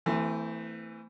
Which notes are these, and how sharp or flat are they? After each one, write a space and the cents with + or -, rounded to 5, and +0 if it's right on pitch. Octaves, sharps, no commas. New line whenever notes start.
E3 +0 A3 +30 C4 -20